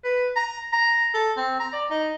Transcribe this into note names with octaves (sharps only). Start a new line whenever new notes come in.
B4
A#5
A#5
A4
C4
A#5
D5
D#4